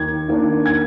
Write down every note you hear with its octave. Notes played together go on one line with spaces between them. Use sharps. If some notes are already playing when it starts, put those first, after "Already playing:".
Already playing: D#2 G#6
D#3 A#3 D4
G#6